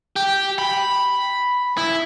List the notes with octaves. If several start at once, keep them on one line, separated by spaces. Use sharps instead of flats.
G4
B5
E4